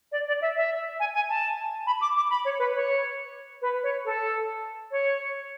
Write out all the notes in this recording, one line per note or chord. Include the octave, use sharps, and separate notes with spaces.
D5
D5
E5
E5
G#5
G#5
A5
B5
D6
D6
B5
C#5
B4
C#5
B4
C#5
A4
C#5